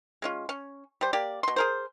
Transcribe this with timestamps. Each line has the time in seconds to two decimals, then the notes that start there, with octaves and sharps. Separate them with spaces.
0.22 G#3 C#4 F4
0.49 C#4
1.01 G3 C5
1.13 A#3 G4 D5
1.43 B2 C6
1.56 G#4 A#4 C5